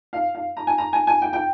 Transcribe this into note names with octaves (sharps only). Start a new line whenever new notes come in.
F5
F5
A#5
G#5
A#5
G#5
G#5
G5
G5